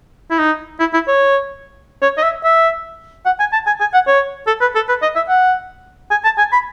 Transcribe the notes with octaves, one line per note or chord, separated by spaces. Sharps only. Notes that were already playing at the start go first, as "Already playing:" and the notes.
E4
D#4
E4
E4
C#5
C#5
D#5
E5
E5
F#5
G#5
A5
G#5
G#5
F#5
C#5
A4
B4
A4
B4
D#5
E5
F#5
G#5
A5
G#5
B5